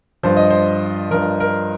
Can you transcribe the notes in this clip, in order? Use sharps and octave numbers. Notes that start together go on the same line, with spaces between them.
G2 F3 C5
D#5
C5
G2 F3 A#4
A#4